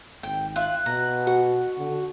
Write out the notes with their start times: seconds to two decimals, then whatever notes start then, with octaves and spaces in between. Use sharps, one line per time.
0.23 G#1 G5
0.56 F4 E5 F#6
0.86 B2 A#5
1.27 F#4 F#5
1.78 D3